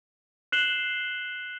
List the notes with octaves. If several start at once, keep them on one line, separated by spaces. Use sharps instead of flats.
F#6 C7 E7 F#7 G7